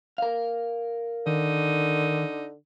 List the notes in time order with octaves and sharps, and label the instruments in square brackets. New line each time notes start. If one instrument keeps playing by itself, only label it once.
[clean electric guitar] A#4 F5
[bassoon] D3 [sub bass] D#3 [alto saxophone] D#4